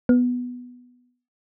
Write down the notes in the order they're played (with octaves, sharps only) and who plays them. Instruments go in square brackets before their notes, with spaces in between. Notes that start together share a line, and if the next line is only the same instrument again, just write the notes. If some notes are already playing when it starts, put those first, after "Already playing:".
[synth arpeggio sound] B3